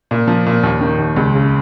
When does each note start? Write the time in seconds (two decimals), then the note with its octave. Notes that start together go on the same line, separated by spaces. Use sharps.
0.11 A#2
0.27 F3
0.46 A#2
0.63 D#2
0.81 D#3
0.99 D#2
1.16 C#2
1.34 C#3